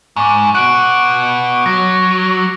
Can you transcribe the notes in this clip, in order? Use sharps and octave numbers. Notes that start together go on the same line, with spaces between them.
G#2 C#6 D6
B3 F#4 F#6 D7
F#3 A#6